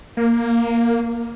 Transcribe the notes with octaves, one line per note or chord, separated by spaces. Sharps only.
A#3